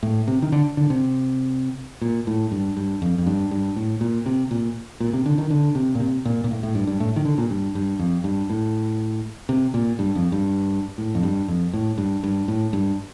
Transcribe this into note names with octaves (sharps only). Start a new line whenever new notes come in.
A2
C3
D#3
D3
D3
C3
A#2
A2
G2
G2
F2
F2
G2
G2
A2
A#2
C3
A#2
A#2
C3
D3
D#3
D3
C3
A#2
C3
A#2
A#2
A2
A2
G2
G2
A2
D#3
D3
A#2
G2
G2
F2
G2
A2
C3
A#2
G2
F2
G2
A2
F2
G2
F2
A2
G2
G2
A2
G2